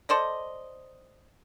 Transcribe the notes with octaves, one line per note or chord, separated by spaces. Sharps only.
A4 C5 D5 D#5